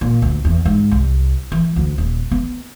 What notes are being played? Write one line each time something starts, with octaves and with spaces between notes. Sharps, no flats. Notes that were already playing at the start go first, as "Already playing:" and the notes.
A#2
D2
E2
G#2
C2
E3
D2
D#1
B3